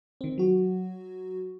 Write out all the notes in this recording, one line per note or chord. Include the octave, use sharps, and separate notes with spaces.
D#3 C4
F#3 F#4